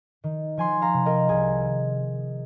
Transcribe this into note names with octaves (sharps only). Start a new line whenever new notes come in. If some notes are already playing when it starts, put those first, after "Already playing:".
D#3
F3 G#5 C6
F5 A#5
C3
A#4 D#5
C2 G#4